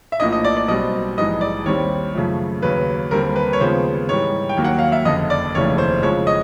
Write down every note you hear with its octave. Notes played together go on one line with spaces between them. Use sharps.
E5
A#1 A2 F3 A#3 D4 D#5
D#5
D5
D5
B1 B2 G3 C4 D#5
A#1 G#2 E3 G3 D#5
D5
D#2 D#3 G3 C4 C#5
F#2 C#3 F3 A3
D#2 C#3 F#3 B4
D#2 D3 G3 C4 A#4
B4
C#5
D#2 C#3 F3 G#3 B3 C5
G#2 E3 G3 C#5
G5
D#2 D#3 F#3 A#3
F#5
F5
E5
F#1 F2 D3 D#5
D5
F1 D#2 C#3 E3 A3 C#5
C5
F2 C#3 F3 G#3 C#5
D#5